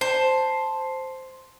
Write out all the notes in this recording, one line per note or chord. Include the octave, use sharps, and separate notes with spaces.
C5 A5